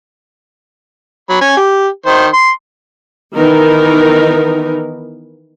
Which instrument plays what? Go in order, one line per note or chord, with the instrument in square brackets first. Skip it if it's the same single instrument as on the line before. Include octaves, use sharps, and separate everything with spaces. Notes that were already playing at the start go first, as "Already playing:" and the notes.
[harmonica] F#3 B5
C#4 G#5
G4
D#3 C5
C6
[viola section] D#3 E3 B3 D#4 A#4